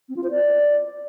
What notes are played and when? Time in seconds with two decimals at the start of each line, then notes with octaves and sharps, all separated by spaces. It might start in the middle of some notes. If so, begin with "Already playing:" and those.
0.09 C4
0.16 F4
0.23 C5
0.31 D5